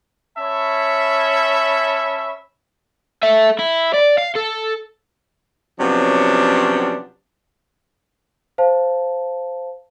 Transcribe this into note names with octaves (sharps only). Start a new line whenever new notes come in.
C#4 C#5 E5 A5 B5
A4 E5
E4
D5
F5
A4
C3 F3 F#3 B3 C#4 D4
C5 F5 A5